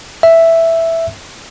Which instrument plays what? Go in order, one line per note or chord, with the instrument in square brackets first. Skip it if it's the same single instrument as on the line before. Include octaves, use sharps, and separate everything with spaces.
[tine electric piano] E5